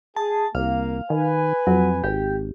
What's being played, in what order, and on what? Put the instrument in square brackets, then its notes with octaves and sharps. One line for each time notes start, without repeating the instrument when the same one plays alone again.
[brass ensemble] G#4 [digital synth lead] A5
[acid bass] C2 [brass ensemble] A#3 [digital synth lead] F5
[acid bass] D#3 [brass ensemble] B4 G#5
[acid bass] F2 [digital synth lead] F#3
[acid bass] G#1 [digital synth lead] G4